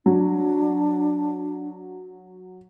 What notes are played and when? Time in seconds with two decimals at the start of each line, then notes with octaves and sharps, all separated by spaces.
0.06 F#3 D4